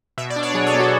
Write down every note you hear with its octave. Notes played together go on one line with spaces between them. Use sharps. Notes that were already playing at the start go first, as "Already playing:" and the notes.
B2 E5
D5
D4
C#5
F#3 G#4
A4
B3
F#4